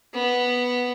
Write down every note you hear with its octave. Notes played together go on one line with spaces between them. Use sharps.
B3